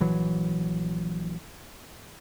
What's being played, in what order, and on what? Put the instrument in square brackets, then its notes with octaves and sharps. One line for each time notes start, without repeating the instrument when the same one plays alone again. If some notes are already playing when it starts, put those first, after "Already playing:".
[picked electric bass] A#1 E3 F#3